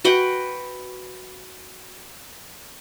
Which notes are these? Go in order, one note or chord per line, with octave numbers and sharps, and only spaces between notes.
F#4 B4 F#5 G5